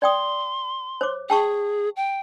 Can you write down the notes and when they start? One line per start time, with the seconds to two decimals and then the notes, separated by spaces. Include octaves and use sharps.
0.02 D5 G5 C6 D#6
1.01 C5 C#5 D6
1.30 G#4 G5 A5 C#6
1.96 G5